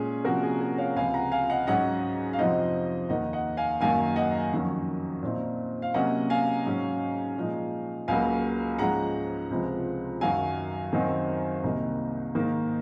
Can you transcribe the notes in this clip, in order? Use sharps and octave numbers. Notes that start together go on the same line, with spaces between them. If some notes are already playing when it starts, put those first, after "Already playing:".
Already playing: A#2 G#3 C#4 G#4
C3 F3 A#3 C#4 F#4 A#4
G#4
G#4
C#5 F5
C#2 C3 F3 F5 G#5
F#5 A#5
F5 G#5
D#5 F#5
G#2 F#3 C#4 D#5 F#5
F5
F2 C3 F3 C4 D#4 D#5 F#5
D#2 D#3 A#3 D#5 F#5
D#5 F#5
F5 G#5
F#2 D#3 F#3 A#3 F5 G#5
D#5 F#5
F2 D#3 F#3 C#4
A#2 F3 C4 D#4
F5
C3 F#3 A#3 C#4 D#5 F#5
F5 G#5
G#2 F#3 C#4
A#2 F3 G#3 D#4
C#2 C#3 F#3 A#3 F5 G#5
G#2 F3 G#3 C#4 F#5 A#5
C#2 C3 F3 G#3 C4
F#2 D#3 F#3 F5 G#5
F#2 D#3 F#3 C4 D#4
C2 C3 D#3 A#3 D#4
G#2 D#3 A#3